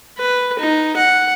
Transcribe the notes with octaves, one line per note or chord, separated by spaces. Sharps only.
B4
D#4
F#5